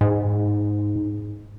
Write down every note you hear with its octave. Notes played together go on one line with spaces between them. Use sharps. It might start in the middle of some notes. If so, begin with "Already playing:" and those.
G#2